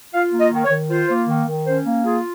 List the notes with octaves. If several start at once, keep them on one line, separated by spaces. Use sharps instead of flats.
F4 F5
A#3
D#5
D#3
C#5
D#3
F4 C5
A#3
D#3
D#3
C#4 C5
A#3
F4 G#4